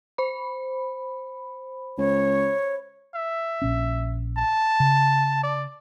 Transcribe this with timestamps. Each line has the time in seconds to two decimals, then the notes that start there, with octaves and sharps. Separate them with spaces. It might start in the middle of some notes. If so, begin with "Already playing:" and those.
0.18 C5 B5
1.98 C#2 C#5
3.15 E5
3.62 A#1 C#4
4.37 A5
4.80 C#3
5.43 D5